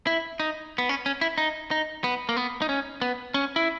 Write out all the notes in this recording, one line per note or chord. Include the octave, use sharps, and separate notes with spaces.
E4
D#4
B3
C#4
C#4
E4
D#4
D#4
B3
A#3
B3
D#4
C#4
B3
C#4
E4